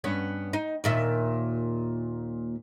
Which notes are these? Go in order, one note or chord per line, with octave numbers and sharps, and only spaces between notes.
G2 B3 C#4
D#4
D#2 A#2 E5